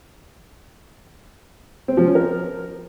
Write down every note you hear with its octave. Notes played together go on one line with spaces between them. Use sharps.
C4
F3
C#4
A#4